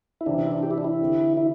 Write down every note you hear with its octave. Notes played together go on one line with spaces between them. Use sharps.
E4
C3 E3 C4 D4 G4 E5
D4
E4
D4
G4
E4
D4
E4
D3 C4 G4
E4